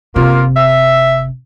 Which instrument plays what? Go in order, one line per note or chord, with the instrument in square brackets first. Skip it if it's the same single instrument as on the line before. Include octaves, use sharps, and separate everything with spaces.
[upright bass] F#1 C3 [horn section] A#3 F4
[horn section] E5